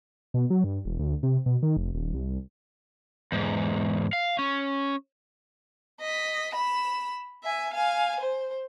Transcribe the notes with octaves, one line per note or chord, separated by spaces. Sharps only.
B2
F#3
G2
E1
D2
C3
B2
D#3
F1
D#1
C2
E2 G#2
F5
C#4
D#5 B6
B5 E7
E5 G#5
F5 G#5
C5